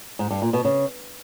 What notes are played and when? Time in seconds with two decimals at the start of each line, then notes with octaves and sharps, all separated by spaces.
0.19 G#2
0.31 G2
0.42 A#2
0.53 B2
0.65 C#3